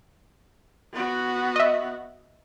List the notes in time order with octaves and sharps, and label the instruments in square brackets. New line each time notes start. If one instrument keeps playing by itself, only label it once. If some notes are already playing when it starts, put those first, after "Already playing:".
[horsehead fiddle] B3 F#4
[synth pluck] D#5 E5